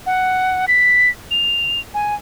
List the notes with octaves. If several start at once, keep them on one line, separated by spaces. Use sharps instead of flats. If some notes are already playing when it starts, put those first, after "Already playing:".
F#5
B6
F7
G#5